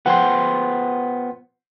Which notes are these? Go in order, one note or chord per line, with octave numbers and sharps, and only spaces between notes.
B3 F4 C5 F#5 G5 C6